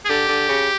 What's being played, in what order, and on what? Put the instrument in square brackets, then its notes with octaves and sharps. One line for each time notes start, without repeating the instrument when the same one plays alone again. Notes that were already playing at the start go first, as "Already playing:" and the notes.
[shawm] G#4
[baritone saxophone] D3 [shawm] G4
[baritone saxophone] D3
C#3